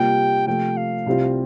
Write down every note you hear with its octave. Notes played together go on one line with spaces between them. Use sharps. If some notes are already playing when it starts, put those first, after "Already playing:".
Already playing: C3 G3 A#3 F4 G5
C3 F3 A3 G5
F5
C2 C3 G3 C4 F4